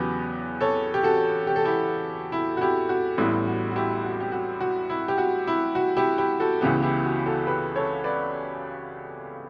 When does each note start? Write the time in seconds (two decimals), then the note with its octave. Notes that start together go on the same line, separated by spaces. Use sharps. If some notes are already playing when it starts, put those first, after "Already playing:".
Already playing: E2 C#3 F#3 B3 G4 B4
0.60 A4 C#5
0.94 G4
1.03 F#4 A4
1.47 G4
1.56 A4
1.65 E4 G4
2.32 E4
2.57 F#4
2.61 E4 G4
2.89 F#4
3.18 A1 A2 G3 B3 E4
3.47 F#4
3.71 F#4
3.76 E4 G4
4.04 F#4
4.20 G4
4.32 F#4
4.60 F#4
4.90 E4
5.08 G4
5.18 F#4
5.47 E4
5.75 F#4
5.97 E4 G4
6.18 E4 G4
6.40 F#4 A4
6.61 C#2 C#3 E3 B3 E4 G4
6.82 E4 G4
7.04 F#4
7.26 F#4 A4
7.47 G4 B4
7.76 A4 C#5
8.04 B4 D5